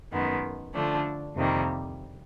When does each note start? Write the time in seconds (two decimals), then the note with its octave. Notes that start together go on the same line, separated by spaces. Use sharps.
0.12 F#2 D#3 G#3 B3
0.74 D3 F3 A3 D4
1.35 F2 C3 D#3 G3 A#3